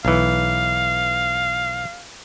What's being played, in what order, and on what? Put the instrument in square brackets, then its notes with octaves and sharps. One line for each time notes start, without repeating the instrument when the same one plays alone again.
[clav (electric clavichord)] B1 E3 [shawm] F5